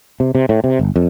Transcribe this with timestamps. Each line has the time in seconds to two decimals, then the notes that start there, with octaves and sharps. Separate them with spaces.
0.20 C3
0.35 C3
0.49 A2
0.64 C3
0.79 G1
0.96 F2